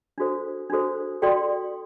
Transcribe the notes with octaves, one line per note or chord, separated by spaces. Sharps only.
D4 F#4 A4 C5
D4 F#4 A4 C5
F#4 A4 D5 G5 C6